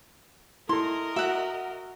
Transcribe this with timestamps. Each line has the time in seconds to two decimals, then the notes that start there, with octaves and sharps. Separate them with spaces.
0.69 E4 A4 A#4 D#5 C6
1.16 F#4 E5 F#5